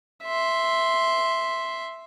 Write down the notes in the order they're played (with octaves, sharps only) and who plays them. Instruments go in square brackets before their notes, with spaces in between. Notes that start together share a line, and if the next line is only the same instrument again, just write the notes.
[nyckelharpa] E5 C6